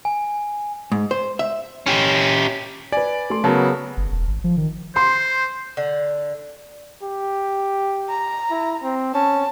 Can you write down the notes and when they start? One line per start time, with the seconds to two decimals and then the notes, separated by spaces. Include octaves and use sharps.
0.05 G#5
0.92 G#2
1.11 C5
1.39 E5
1.86 C#4 G4
2.92 B4 D5 G#5
3.30 A3 C6
3.44 C#3 F#3 B3 G#4 A#4 A5
3.97 G1
4.12 E1
4.27 G#1
4.44 F3
4.57 D#3
4.96 C5 C6
5.77 D3
7.03 G4
8.09 A#5
8.51 E4
8.83 C4
9.14 C#4 A5